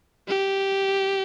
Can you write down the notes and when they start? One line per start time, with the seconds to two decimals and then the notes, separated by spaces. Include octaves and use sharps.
0.28 G4